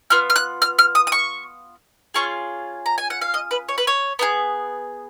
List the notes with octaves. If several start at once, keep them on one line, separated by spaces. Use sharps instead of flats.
B3 F4 F6
F6
F#6
F6
F6
D#6
D#6
C#6
C#4 F4 G#4 C#6
A#5
G#5
F#5
F5
D#5
B4
C#5
B4
C#5
B3 D#4 G#4